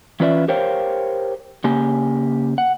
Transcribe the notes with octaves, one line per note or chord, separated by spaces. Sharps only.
E3 C#4 F4 B4 D5 E5
G4 A#4 C5 C#5 F5 G5
C#3 A#3 G4 G#5
F#5